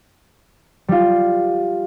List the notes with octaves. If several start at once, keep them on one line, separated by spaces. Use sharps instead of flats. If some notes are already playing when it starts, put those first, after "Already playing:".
G3 F4